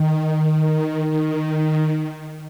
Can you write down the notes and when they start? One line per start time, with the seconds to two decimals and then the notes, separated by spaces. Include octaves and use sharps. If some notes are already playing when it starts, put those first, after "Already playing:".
Already playing: D#3
1.10 D#3